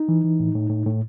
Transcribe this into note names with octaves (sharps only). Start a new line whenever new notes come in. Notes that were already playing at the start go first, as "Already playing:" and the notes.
Already playing: D#4
E3
E3
A2
A2
A2
A2